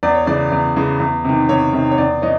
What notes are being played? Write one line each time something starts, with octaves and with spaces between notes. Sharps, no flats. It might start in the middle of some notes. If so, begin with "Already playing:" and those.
E2 D5
C#5
C#3 E3 D5
E2
C#3 E3
E2
C3 D#3
E2 C#5
C3 D#3
C#5
E2 D5
E3 C#5 D#5